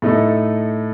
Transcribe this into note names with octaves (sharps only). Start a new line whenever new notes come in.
A2 A3 D#4 A4